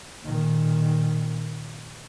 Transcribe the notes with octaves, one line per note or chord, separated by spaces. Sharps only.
A#2 D#3